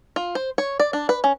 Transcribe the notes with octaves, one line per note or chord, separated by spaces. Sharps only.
F4
C5
C#5
D5
D4
B4
C#4